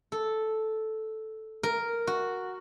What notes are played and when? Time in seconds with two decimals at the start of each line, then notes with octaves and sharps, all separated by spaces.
0.12 A4
1.63 A#4
2.07 F#4